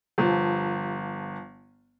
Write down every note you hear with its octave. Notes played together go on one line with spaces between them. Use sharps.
G1 F3